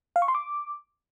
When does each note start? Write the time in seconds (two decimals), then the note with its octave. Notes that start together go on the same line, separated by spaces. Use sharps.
0.16 F5
0.22 C#6
0.28 C6
0.35 D6